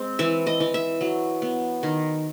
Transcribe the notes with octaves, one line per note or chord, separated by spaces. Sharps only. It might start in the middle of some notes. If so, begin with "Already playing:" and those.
Already playing: G#3 C4
E3 E5
D#5
E3
E5
F#3
B3
D#3